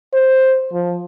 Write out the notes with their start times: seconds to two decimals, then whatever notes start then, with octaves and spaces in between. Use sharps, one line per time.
0.13 C5
0.73 F3